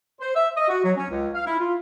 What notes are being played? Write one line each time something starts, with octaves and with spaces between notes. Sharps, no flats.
C5
E5
D#5
F#4
F#3
C#4
C#2
F5
E4
F4